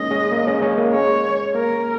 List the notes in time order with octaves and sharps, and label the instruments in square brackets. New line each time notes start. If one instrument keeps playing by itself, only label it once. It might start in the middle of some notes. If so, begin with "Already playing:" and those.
Already playing: [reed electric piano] G#3 A#3 C#4 D#4 [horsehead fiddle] D#5
[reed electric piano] G#3 C#4
A#3
G#3 C#4
G#3 C#4
A#3
[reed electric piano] G#3 C#4 [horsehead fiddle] C#5
[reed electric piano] A#3 [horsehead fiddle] A#4